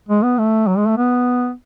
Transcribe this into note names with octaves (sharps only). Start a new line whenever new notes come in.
G#3
B3
A3
F#3
G#3
A3
B3